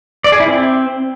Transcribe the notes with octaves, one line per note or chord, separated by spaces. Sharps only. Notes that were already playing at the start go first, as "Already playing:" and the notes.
D5
G#4
E4
C4